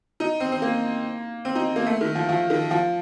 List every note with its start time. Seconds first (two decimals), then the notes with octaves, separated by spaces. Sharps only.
0.20 D#4
0.40 C4
0.52 C4
0.62 A#3
1.45 C4
1.55 D#4
1.76 A#3
1.86 A3
2.01 D#3
2.15 F3
2.29 F3
2.50 D#3
2.71 F3